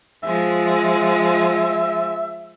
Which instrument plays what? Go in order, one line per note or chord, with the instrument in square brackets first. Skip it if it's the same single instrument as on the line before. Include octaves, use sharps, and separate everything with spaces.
[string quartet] F3 G#3 [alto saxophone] E5